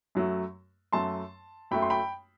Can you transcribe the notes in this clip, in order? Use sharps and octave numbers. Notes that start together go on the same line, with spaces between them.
F#2 F#3 A3
F#2 F#3 A3 A5 C6
F#2 F#3 A3 G5 B5
C6
G5 B5